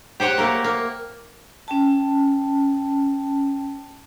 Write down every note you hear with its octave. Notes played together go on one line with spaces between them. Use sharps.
G4 C5 C#5 F#5
A3 A#3 A#4
A#3
C#4 G5 A5